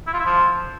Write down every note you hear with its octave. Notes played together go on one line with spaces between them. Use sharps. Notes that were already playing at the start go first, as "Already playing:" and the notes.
E4
F4
E4
F3